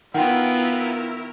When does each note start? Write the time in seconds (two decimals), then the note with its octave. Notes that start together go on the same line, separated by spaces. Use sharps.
0.14 D#3 B3 E4 F4 A#4 F#5 G5